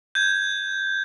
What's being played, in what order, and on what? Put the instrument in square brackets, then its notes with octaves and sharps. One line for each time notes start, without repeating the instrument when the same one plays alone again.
[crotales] G6 G#6